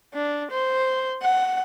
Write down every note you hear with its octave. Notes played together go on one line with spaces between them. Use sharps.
D4
C5
F#5